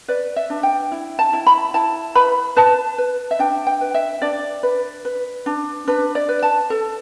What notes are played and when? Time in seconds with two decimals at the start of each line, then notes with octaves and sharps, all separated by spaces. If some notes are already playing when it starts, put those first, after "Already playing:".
0.08 B4 D5
0.36 E5
0.50 D4
0.63 G5
0.92 E4
1.19 A5
1.33 E4
1.47 B5
1.74 E4 A5
2.15 B4 B5
2.56 B4 A5
2.98 B4
3.31 E5
3.39 D4 G5
3.67 G5
3.81 B4
3.94 E5
4.22 D4 D5
4.63 B4
5.05 B4
5.46 D4
5.88 D4 B4
6.15 D5
6.29 B4
6.43 A5
6.70 A4